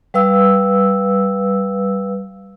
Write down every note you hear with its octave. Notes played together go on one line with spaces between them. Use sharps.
G3 B4 F5 E6